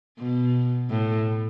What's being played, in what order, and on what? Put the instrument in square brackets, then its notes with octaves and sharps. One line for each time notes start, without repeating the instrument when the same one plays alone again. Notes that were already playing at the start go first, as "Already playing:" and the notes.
[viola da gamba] B2
A2